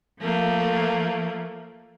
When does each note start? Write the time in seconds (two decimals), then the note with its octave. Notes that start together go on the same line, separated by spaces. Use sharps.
0.20 F3 A3 A#3